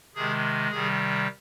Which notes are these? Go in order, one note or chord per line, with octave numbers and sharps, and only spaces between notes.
C3 D#3 G#3 G#4
C3 D#3 G3 G#4